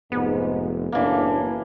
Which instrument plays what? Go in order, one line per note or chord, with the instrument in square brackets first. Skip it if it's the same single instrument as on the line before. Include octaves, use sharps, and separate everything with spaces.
[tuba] F1 [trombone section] G#2 [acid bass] B3
[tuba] F#1 [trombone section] A2 D4 [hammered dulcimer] E3 A#3